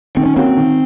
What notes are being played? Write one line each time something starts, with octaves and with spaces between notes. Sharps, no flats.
D#3 C4
C#4
A#3 C4 C#4 F#4
D#3